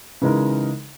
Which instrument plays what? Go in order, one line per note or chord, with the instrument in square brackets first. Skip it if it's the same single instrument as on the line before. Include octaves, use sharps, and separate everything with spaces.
[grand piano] C#3 E3 G#3 D#4 A#4